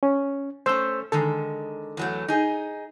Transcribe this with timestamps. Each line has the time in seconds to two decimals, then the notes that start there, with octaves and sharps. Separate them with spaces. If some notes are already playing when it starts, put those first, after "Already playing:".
0.03 C#4
0.66 A3 C#4 C5 E6 G6
1.12 D3 D#3 G#3 A4
1.97 E2 F#3 A3
2.28 D#4 G#4